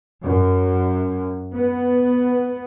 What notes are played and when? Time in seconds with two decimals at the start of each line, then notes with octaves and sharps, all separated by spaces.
0.23 F#2
1.54 B3